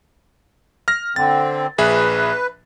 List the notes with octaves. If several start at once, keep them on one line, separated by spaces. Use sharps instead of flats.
F6 A#6
D3 C4 A6
A#1 G#4 B4 E5